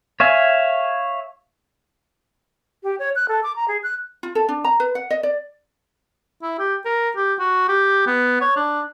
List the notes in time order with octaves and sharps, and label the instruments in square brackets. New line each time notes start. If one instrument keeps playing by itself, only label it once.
[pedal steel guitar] C#5 E5 F5 G#5
[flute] G4
C#5
F#6
A4
D6
A#5
G#4
F#6
[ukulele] F4
A4
D4
A#5
B4
F#5
D#5
D5
[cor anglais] E4
G4
A#4
G4
F#4
G4
B3
C#5
D4